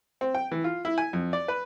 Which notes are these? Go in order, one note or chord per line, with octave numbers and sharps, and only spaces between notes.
C4
G5
E3
F4
E4
G#5
F2
D5
B4